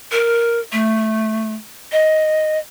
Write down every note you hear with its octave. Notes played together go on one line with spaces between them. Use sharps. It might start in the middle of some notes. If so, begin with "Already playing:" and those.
A#4
A3
D#5